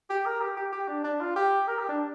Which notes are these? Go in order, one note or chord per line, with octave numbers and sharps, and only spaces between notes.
G4
A#4
G4
G4
G4
D4
D4
F4
G4
A#4
G4
D4